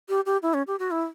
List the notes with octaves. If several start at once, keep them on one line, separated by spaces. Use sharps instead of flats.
G4
G4
E4
C#4
G4
F#4
E4